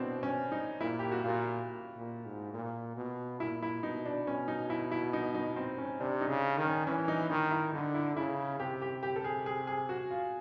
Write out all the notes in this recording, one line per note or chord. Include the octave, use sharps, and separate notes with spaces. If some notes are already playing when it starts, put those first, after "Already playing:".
Already playing: B2 C4 D4 E4
C#4
D#4
A#2 E4
G4
F#4
A#2 F4
A#2
G#2
A#2
B2
A#2 E4
E4
B2 D#4
D4
B2 C#4
D#4
E4
E4
D#4
D#4
C4
C#4
C3 D4
D#4
C#3
D#3
C#4
E3 C#4
D#4
D#3 D#4
E4
D3 D#4
E4
C#3 E4
C3 G4
G4
G4
A4
G#4
G#4
G#4
F#4
F4